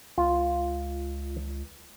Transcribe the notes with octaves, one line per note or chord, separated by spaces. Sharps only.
C#2 F4